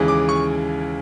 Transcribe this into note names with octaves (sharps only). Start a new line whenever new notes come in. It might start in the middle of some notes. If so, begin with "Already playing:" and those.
Already playing: D#2 C#3 E3 G#3
D6
C#6